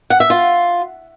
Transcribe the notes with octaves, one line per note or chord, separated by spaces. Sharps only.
F#5
E5
F4